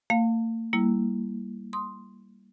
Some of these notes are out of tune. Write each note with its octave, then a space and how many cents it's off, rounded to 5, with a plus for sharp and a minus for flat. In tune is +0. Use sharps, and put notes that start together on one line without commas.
A#3 -45 F5 +10
G3 +0 A#3 +0 E4 +0
C6 +0 D#6 +0